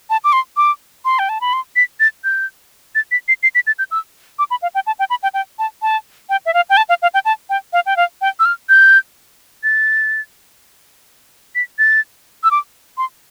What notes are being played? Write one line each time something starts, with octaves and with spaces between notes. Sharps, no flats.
A5
D6
C6
D6
C6
G5
A5
B5
C6
B6
A6
G6
A6
B6
C7
C7
B6
A6
G6
E6
D6
B5
F5
G5
A5
G5
B5
G5
G5
A5
A5
G5
E5
F5
G5
A5
F5
F5
G5
A5
G5
F5
G5
F5
G5
E6
F6
G6
A6
B6
A6
E6
D6
C6